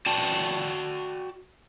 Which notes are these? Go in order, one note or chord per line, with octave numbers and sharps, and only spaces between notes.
F#4 D5 G5 A5